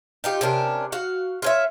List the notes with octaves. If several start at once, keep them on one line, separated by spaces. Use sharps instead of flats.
D#4 F4 G4
C3 C#4 D4 A#4
F#4 F5
F4 C#5 E5